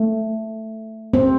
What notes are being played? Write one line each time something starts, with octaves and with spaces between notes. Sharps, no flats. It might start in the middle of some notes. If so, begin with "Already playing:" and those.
Already playing: A3
C4